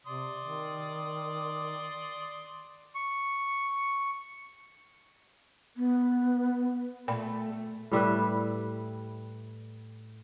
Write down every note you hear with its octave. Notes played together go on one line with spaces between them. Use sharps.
C3 D5 C6 D#6
D#3
C#6
B3
A#2 A3 G5 B5
A2 G3 E4 B4